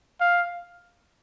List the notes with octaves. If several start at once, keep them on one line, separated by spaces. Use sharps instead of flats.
F5